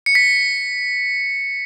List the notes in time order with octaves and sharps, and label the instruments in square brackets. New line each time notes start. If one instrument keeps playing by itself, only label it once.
[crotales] C#7
B6